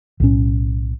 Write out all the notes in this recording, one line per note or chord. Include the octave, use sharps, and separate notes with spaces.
B1 A2 C#4